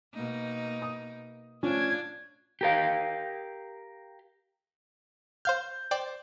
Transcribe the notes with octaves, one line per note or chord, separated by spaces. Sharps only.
B2 A#3 D#4
D#6
A2 F3 C#4 D4 F4 G#6
G4 A#4 F5
C5 F5 F6 G6
C5 D5 G5